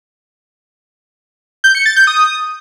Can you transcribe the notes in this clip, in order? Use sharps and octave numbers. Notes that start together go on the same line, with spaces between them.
G6
C#7
A6
G6
D#6